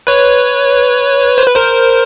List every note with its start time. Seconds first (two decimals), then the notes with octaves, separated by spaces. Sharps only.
0.07 B4 C#5
1.38 C5
1.46 B4
1.56 A#4 C5